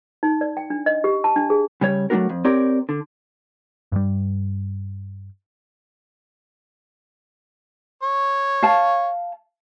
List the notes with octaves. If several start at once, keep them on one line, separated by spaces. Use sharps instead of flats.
D#4
D5
G5
D4
D#5
G4
A5
D4
G#4
C#3 G3 C#5
F#3 A3 C#4 D4 F#4 A#4
F2
C4 G4 A#4 C#5 D5
D3
G2 G3
C#5
F5 A5